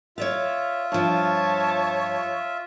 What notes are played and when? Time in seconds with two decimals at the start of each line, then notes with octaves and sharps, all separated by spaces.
0.18 F4 C#5 D5 E5 F5
0.92 G2 F3 C#5 A5